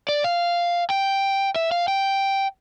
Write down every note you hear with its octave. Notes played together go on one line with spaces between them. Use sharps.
D5
F5
G5
E5
F5
G5